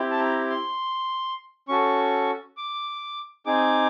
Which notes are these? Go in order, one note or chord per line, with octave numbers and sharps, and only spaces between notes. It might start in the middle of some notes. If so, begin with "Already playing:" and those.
Already playing: C4 E4 G4
A5
A#5
C6
C#4 F#4 A4 C#6
D6
C4 D#4 G#4 D6